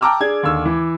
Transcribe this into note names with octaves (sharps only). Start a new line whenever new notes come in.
G5 A5 A#5 D6 E6 F6
D4 G#4 G#6
D#2 D3 E6
E3